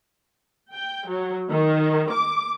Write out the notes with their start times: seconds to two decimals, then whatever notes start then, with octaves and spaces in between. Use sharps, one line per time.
0.74 G5
1.08 F#3
1.50 D#3
2.12 D6